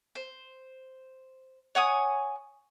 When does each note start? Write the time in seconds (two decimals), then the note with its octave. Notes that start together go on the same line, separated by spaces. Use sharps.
0.15 C5
1.75 C#5 F#5 G#5 D#6